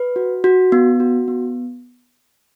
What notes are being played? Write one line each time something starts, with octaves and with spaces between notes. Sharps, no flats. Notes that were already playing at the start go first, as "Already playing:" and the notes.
Already playing: B4
F#4
F#4
B3
F#4
B3